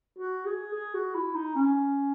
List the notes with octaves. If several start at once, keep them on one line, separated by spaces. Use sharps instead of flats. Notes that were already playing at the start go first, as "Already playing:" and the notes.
F#4
G#4
G#4
F#4
E4
D#4
C#4